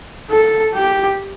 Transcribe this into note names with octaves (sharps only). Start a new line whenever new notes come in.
A4
G4